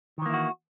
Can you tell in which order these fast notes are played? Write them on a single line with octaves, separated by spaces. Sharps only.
D#3 E3 A#3 E4 F#4